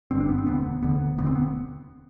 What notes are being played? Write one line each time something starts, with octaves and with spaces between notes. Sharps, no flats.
G1 G2 D3 C4
D4
B3
C4
E1 D2 D3 B3
E1 D2 D3 B3
E1 D2 D3 B3
C4
B3